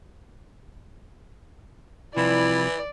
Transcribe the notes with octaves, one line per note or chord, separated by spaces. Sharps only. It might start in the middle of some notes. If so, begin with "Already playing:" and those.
C2 C3 E3 F3 E4 D5